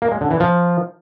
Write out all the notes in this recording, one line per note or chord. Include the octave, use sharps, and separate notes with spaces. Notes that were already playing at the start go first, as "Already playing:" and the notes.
A#3
G#3
D3
E3
F3